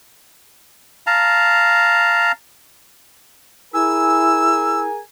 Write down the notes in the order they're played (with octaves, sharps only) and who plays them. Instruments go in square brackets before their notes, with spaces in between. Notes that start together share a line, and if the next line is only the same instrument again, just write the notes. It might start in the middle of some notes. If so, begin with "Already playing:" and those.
[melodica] F5 A5 A#5
[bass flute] E4 [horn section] G#4 A#4 G#5 [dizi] E6